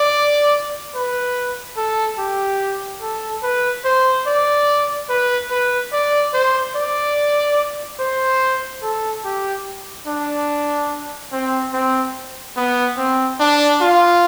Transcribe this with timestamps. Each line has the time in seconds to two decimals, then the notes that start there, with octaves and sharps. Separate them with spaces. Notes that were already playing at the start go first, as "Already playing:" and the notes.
Already playing: D5
0.95 B4
1.77 A4
2.18 G4
3.01 A4
3.43 B4
3.84 C5
4.26 D5
5.09 B4
5.51 B4
5.92 D5
6.34 C5
6.75 D5
7.99 C5
8.82 A4
9.25 G4
10.07 D4
11.32 C4
11.73 C4
12.57 B3
12.97 C4
13.40 D4
13.81 F4